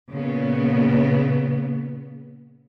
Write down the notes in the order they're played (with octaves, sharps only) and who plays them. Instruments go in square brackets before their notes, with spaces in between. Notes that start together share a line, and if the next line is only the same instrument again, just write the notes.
[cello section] A#2 C#3 B3